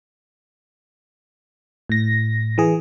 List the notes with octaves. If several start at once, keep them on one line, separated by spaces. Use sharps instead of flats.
A2 A#6
E3 G#4